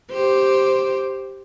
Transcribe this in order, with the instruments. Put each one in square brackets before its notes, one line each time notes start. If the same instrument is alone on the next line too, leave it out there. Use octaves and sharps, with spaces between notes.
[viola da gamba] G4 C5